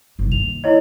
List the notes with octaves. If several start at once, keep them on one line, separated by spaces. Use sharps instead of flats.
G1 C2
D#3 A#3 F7
E4 C#5 D#5